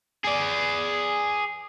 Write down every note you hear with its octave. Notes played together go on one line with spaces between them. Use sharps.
G#4 D5